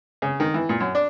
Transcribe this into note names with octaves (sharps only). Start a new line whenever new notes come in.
C#3
D#3
E3
A#2
F#2
D4